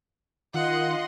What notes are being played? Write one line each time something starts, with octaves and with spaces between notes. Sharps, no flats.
D#3 F4 D#5 F#5 C6